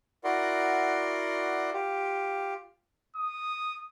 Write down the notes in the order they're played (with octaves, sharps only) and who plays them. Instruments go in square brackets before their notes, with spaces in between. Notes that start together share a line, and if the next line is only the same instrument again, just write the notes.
[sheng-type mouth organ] E4 F#4 A#4 D5 F#5 C6
F4 G4
[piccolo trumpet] D#6